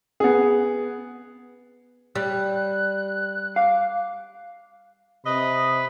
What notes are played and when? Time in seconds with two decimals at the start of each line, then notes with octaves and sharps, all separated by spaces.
0.20 B3 G#4
2.15 G3 F#6
3.56 F5 D6
5.25 C3 B4 D#5